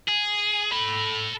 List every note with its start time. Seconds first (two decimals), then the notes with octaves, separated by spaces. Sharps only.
0.08 G#4
0.73 A4 B5